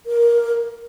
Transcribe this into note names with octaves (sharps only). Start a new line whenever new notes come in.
A#4